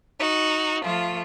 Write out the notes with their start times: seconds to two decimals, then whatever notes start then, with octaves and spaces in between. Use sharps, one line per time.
0.19 D#4 F#4
0.84 F3 A3 F4